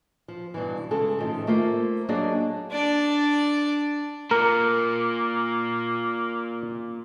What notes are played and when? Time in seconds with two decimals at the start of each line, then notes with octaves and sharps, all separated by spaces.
0.28 F3
0.54 G2 B2 E3
0.91 C#3 G#3 A4
1.19 A2 D#3 F3
1.47 A3 A#3 F4 C5
2.09 F#3 A#3 D4 G#4 D5 D#5
2.71 D4 D5
4.31 A#2 A#3 A#4